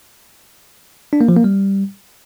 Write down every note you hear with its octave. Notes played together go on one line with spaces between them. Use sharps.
D4
A#3
F3
A#3
G3